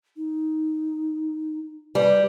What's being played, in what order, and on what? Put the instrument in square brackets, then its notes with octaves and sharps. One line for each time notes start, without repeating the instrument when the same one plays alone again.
[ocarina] D#4
[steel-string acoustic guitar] G3 [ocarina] B4